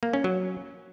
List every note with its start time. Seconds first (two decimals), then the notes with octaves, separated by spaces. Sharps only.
0.03 A#3
0.13 C#4
0.24 F#3